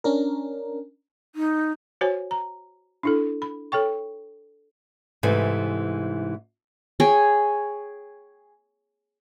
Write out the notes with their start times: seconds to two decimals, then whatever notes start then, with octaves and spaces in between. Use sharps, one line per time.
0.04 C#4 D4 A#4
1.35 D#4
2.01 F#4 C5 C#5 G#5
2.31 A#5
3.03 D4 E4 A4
3.42 B5
3.72 A4 C#5 G5 C#6
5.23 G#2 C3 E3 A3
7.00 G#4 C#5 G5